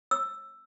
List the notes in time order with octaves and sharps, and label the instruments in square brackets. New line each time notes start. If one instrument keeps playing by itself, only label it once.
[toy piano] E6